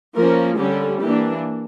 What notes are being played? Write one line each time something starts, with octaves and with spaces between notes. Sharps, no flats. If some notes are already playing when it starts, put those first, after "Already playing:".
F3 A#3 C#4 A#4
D3 G3 C#4 G4
E3 A#3 D4 G4